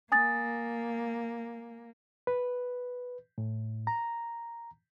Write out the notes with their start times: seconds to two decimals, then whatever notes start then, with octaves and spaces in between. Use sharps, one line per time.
0.12 A#3 G#5 D#6 A6
2.27 B4
3.38 A2
3.87 A#5